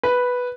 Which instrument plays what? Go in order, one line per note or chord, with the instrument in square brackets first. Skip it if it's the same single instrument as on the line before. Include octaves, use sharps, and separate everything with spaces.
[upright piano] B4